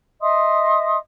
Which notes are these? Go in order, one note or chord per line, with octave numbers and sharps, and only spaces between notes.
D#5 E5 C6 D#6